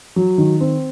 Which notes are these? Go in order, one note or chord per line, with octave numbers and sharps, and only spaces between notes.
F#3
D#3
C4